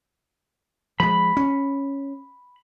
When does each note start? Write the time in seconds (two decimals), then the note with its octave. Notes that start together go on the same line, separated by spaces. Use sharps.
1.00 F3 G#3 B5
1.37 C#4